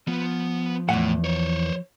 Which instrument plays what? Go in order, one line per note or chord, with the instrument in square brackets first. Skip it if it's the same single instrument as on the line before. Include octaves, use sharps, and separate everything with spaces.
[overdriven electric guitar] F3 [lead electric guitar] B3
[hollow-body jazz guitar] E2 F#5 [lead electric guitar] A2
[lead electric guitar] C5 C#5